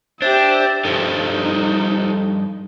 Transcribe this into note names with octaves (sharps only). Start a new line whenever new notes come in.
D4 G4 C5 E5
G2 F3 D#4 G4 A4 C5